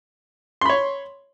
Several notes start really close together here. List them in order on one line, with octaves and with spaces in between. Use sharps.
C6 B5 C#5